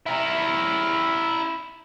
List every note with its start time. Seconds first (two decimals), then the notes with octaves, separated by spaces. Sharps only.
0.06 E4 A#4